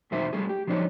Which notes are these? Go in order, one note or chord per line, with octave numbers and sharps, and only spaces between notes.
B1 E2 D#3 F#3 C5 E5
G3 A3 F4 G#4
G4
F3 F#3 D4 D#4 C#5